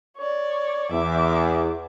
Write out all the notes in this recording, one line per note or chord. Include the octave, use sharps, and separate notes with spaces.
C#5 D5
E2 E5 D6